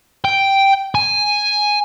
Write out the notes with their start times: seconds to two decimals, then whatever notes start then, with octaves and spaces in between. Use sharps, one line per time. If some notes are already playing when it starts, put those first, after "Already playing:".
0.25 G5
0.95 G#5